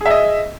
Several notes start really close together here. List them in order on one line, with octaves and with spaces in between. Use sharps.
G#4 E5 D#5